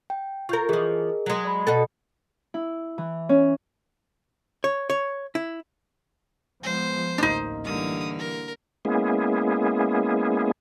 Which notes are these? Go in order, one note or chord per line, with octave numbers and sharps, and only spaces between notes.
G5
F4 A#4 C#6 G6
E3 F3 G#4 A#4 D#5
F#3 G#3
D5 B5
B2 F#4 A4
E4
E3
C#4
C#5
C#5
E4
F3 G#3 B3 C5
A1 D2 A#3 D4 D#4
D3 E3 G3 A#3 D#6
A#4
G#3 A#3 B3 C#4 E4 G#4